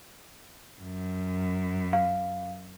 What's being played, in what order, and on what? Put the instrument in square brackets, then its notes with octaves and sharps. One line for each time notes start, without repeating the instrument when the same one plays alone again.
[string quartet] F#2
[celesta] F5